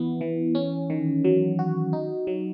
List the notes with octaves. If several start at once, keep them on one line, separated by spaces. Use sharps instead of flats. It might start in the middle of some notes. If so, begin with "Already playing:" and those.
Already playing: E3 B3 E4
E3
C#4
D#3
F#3
F#4
D#4
F#3